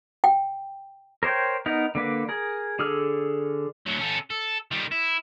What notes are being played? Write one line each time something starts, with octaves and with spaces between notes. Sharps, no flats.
G5
A#4 C5 C#5 G5
B3 D#4 A#4
D3 A#3 B4
G#4 A#4
D3 G#4 A4 F6
D2 F#3
C#4 A4
A4
D#3 G3
E4